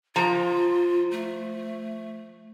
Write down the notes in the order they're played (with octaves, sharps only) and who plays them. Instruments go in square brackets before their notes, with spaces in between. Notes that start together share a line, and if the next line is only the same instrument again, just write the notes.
[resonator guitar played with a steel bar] F3 A#5 [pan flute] F4
[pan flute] A3